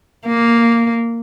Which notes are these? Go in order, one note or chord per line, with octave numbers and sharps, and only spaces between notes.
A#3